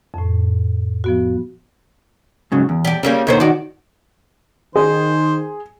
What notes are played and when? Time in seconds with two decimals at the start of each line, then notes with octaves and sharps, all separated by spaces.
0.14 F2 A2
1.04 F3 B3 F#4
2.52 G#2 C#3 F#3
2.69 E2
2.85 G3 G4
3.03 C#3 G3 A#3 C#4
3.27 D#2 D3 D#3 C5 C#5
3.40 D#3 D#4 F#4 D5
4.76 D#3 G#4 C5